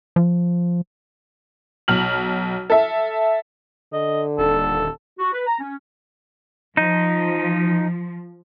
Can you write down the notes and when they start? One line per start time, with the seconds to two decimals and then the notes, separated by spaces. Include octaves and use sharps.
0.16 F3
1.88 B1 F6 F#7
2.70 A4 E5
3.93 D3 D#5
4.38 D#1 A4
5.19 F#4
5.33 B4
5.46 A#5
5.60 C#4
6.77 F3 D#4